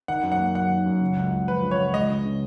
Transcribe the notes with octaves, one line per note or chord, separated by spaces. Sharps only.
D#3 F#5
F#2
F#5
A#3
F#3 F#5
D#3
F#2
C#3
C#2
C#2
F3 B4
C#3
C#5
C#2
G#3 D#5
C#3
C#3